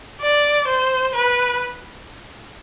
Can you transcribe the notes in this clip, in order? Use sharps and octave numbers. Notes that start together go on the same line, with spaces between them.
D5
C5
B4